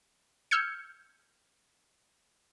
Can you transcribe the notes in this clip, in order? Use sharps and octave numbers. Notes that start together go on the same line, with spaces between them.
E6 F6 G6 G#6 C#7